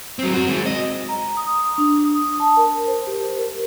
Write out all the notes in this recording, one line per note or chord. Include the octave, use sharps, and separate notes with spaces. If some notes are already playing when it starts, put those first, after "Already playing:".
F#3 C4
F#2 F#4
G#3 C4
C#2 D#5
A#5
D#6
D4
D#6
A5
A#4
C5
G4
A#4